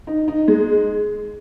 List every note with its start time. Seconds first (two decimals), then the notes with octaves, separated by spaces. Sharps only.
0.07 D#4
0.28 D#4
0.48 G#3